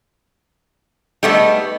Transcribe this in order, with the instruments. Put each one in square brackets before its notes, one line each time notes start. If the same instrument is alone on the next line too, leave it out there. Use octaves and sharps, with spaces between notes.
[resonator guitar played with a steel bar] G3 A3 B3 [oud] D#4 G#4